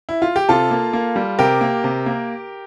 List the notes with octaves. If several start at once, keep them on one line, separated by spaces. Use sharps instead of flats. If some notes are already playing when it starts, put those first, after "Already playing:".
E4
F4
G4
C3 F4 A4
A#3
A#3
G3
C3 G4 A#4
A#3
C3
A#3